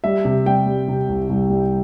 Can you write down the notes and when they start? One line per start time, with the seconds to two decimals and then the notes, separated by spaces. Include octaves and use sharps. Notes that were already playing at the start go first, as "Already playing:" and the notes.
0.04 G3 E5
0.25 C3
0.46 G3 G5
0.67 G3
0.88 C3
1.09 C2
1.29 C2
1.50 G3